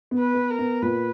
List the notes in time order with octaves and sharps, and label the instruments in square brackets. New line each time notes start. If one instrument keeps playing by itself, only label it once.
[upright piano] B3
[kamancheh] B4
[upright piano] B3
[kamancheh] A#4
[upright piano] B3
[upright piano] A#2 [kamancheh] B4